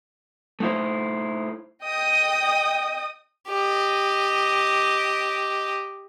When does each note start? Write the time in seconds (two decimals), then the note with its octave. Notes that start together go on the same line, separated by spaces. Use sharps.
0.60 A3 D#4 E4 C5
1.84 D#5 G5 D#6
3.48 G4 D#5